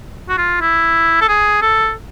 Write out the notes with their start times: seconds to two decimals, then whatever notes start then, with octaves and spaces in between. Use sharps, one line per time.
0.29 F#4
0.38 F4
0.61 E4
1.21 A4
1.28 G#4
1.62 A4